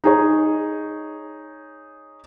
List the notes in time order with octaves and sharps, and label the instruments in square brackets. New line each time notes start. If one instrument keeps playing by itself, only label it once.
[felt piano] D#4 G#4 C#5